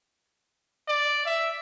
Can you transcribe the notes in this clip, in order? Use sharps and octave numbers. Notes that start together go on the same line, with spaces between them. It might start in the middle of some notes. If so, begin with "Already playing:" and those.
D5
E5